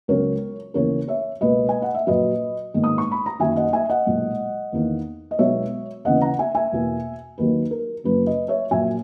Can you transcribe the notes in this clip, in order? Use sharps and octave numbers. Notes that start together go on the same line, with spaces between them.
C#2 C#3 F#3 B3 A#4 C#5
D#2 C#3 E3 B3 A#4 C#5
C#5 E5
C#2 B2 A#3 B4 D#5
G#5
F#5
E5
A#1 A#2 F#3 B4 D#5
A#1 G#2 D#3 G#3 B3
D#6
C#6
B5
A#5
F#2 D#3 F#3 A#3 E5 G#5
D#5 F#5
E5 G#5
D#5 F#5
B1 A#2 G#3 B3
E2 D#3 A#3
D#5
B1 B2 G#3 B3 C#5 E5
D#2 C#3 E3 B3 D#5 F#5
F#5 A#5
E5 G#5
E5 G#5
E2 B2 A#3
D#2 D#3 F#3 A#3 B4
A#4
F#1 F#2 C#3 F#3 B4
B4 D#5
C#5 E5
A#1 A#2 F#3 A#3 E5 G#5